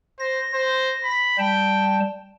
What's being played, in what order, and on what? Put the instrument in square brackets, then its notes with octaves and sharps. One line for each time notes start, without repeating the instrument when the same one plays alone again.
[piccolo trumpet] C5 [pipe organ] A#6
[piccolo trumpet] C5
B5
[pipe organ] G3 A5 [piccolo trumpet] G5